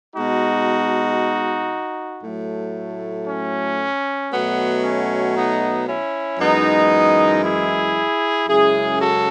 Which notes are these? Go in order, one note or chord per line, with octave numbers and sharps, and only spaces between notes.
B2 G#3 D#4 F#4
A2 F#3 A3
C#4
B2 F#3 A3 B3
C#4
B3 D#4
C#4 E4
F#2 E3 G#3 B3 D#4
E4 G#4
F#2 C#3 G#3 E4 G#4
F#4 A4